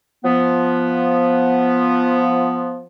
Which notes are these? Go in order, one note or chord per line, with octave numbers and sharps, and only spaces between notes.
F3 B3